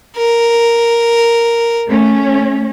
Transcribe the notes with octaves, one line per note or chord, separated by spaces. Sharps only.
A#4
A3 C#4